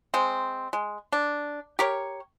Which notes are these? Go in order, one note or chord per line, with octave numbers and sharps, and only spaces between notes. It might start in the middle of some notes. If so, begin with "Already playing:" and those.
G#3 C4
G#3
D4
G4 A#4 C#5